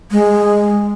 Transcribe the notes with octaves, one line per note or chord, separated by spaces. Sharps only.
G#3